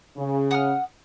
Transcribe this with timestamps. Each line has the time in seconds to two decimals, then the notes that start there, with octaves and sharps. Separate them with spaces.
0.17 C#3
0.51 F#5 D#6 F6